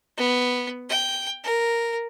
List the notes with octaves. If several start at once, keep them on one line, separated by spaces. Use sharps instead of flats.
B3
G5
A#4